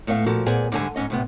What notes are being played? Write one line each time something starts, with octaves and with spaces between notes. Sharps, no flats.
A2 A3 B3 C#5 F5
A#2 F3 F#4 A4
A#2 B3 G#4 C5 D5 G#5
D2 G#2 D3 G3 G#5
G#2 F3 C#4 D#5
A2 C3 B3